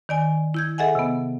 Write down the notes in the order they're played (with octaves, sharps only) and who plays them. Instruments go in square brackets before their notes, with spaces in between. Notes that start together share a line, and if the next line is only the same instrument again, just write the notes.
[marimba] D#3 D5 G#5
E4 G6 G#6
G#4 A4 D#5 E5 F#5 G#5
C3 B3